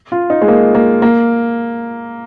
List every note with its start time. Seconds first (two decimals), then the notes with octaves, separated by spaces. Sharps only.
0.12 F4
0.30 D#4
0.42 G#3
0.48 A#3
0.75 A#3
1.02 A#3